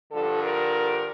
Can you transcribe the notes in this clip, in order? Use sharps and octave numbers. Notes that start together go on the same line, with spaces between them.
G2 D3 F3 A4
A#4